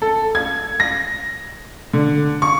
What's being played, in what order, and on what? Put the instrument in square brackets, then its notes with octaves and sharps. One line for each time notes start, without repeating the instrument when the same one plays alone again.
[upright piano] A4
G#6
A#6
D3
C#6